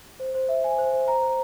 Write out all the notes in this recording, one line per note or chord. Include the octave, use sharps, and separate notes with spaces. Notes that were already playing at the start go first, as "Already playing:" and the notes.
C5
C5
E5
G#5
C5
C5
A#5
C5